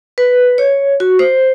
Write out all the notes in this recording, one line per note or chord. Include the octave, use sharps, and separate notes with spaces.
B4
C#5
F#4
C5